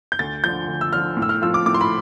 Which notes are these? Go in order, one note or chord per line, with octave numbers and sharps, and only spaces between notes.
G6
D2 A6
D3 F3 G6
D2
E6
D3 F3 F6
A2
E6
F6
F3 C4 F4 E6
D6
A2 D6
C6
B5